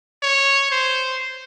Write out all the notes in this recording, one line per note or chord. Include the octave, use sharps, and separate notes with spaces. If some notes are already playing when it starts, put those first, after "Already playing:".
C#5
C5